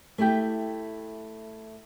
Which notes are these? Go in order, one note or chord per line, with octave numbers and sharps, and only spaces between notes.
A3 E4 G4 G5